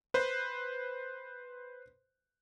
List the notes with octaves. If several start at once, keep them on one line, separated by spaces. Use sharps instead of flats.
B4 C5